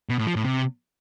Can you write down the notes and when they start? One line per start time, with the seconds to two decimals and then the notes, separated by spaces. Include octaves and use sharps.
0.09 B2
0.18 A2
0.27 F3
0.36 A2
0.45 C3